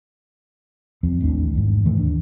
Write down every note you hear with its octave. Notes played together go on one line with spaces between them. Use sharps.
E2 F3 C4
A1 D#2 A2 D4
E2 G#2
G#2 D#3 E3 A3
D#2 D4